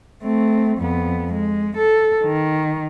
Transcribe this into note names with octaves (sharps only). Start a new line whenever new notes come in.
A3 C4
F2 B3
G#3
A4
D#3